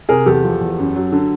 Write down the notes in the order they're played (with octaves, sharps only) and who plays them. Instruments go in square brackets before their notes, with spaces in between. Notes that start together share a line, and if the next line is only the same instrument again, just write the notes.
[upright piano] C3 G#4 A#4
E2 G4 A4
F3
E2
F#2
F#3
D3